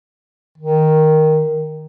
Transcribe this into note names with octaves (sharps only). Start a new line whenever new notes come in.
D#3